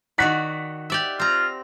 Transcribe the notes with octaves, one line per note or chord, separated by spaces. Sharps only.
D#3 F#4 D5 F#5 F#6 B6
G4 D5 E5
C4 F4 A#5